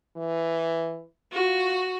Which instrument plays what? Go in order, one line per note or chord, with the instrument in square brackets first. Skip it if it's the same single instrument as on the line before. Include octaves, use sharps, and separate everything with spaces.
[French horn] E3
[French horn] F4 [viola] F#4